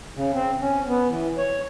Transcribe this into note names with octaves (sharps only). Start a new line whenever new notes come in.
C#3
C4
C#4
B3
E3
C#5